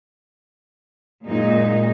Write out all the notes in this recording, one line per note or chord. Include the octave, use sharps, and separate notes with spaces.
F#2 A#2 G#3 D#4